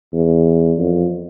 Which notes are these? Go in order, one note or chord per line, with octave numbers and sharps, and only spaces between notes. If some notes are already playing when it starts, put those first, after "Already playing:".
E2
F2